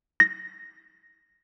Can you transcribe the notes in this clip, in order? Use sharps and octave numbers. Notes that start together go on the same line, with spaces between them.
A#6